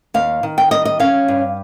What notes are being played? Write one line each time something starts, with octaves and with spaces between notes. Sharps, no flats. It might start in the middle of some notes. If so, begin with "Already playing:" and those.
D#2 F5
D#3
G5
G3 D#5
D#5
C#4 F5
G2